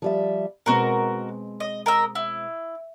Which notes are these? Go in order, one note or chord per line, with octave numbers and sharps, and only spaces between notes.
F3 G3 E5
B2 G#3 C4 F#4 A#4
D#5
A#4 D#5 E6
E4